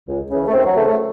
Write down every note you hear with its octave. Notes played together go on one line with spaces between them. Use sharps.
C#2
C#3 E3
A3
D#2 C4
F#3
C#3 E3 A3
A3